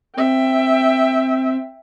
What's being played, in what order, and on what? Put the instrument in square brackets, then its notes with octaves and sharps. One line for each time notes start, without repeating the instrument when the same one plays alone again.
[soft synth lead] C4 [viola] E5 G5